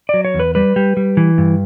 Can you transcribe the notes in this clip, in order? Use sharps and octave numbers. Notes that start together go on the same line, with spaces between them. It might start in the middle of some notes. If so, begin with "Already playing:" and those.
F#3 D5
C#5
E2
B4
G3 B4
G3
G3
E3
G2